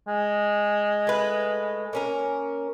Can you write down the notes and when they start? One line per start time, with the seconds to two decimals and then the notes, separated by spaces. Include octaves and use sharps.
0.08 G#3
1.07 A3 B4
1.93 A#3 C#4 A#4